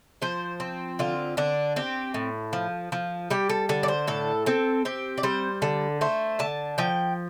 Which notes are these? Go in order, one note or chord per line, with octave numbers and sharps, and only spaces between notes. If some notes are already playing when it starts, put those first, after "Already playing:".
F3 C5
C4
D3 F4
D3 D4
C4 G4
A2
F3
F3
G3 G4
A4
D3 A4
D5
C5
A2 A4
C4 A4
C4 G4
D5
G3 C5
D3 A4
A3 C5
D3 A5
F3 G5